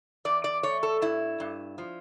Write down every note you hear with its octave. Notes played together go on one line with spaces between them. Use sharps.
E2 D5
D5
A3 C#5
A4
G2 E4
G2
F3